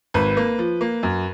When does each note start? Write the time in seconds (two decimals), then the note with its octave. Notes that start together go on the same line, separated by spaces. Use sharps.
0.14 G#1 B4
0.37 A#3
0.59 F3
0.81 A#3
1.03 F#2